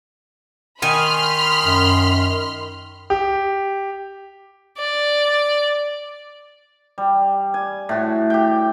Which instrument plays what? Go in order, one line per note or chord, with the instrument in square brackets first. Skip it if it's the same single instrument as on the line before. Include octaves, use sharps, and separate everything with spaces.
[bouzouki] D#3 G#5 [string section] B5 C6 F6
[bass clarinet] F#2
[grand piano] G4
[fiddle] D5
[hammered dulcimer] G3
G#5
A2 F#4
G4 G5